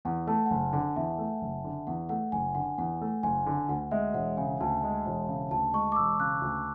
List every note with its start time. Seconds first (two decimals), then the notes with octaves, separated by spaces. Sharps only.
0.05 E2 F#5
0.27 A3 A5
0.46 F#5
0.50 F#1 G#5
0.73 D3 F#5
0.96 E2 E5
1.18 A3
1.42 F#1
1.64 D3
1.87 E2 F#5
2.09 A3 F#5
2.32 F#1 G#5
2.55 D3 F#5
2.78 E2 F#5
3.01 A3
3.23 F#1 G#5
3.46 D3
3.69 D2 F#5
3.91 G#3 E5
4.14 E1 F#5
4.37 C#3 G#5
4.60 D2 A5
4.83 G#3
5.06 E1
5.28 C#3
5.51 D2 A5
5.73 G#3 C#6
5.92 D6
5.96 E1 E6
6.19 C#3 F#6
6.42 D2